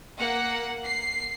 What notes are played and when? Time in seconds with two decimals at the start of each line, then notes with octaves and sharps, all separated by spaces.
0.16 A#3 F#5
0.85 C7